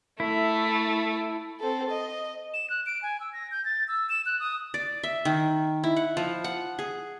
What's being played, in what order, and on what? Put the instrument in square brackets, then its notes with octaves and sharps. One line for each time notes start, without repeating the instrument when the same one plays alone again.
[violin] A3 [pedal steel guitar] E4
[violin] C4 A4
D#5
[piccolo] E7
F#6
D7
G#5
E6
A#6
G6
A6
E6
E7
F#6
D#6
[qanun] D5
E5
D#3
E4
F#5
F3
F#5
G#4